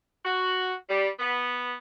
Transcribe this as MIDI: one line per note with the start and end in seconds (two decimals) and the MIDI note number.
0.25 0.74 66
0.89 1.08 55
1.20 1.76 59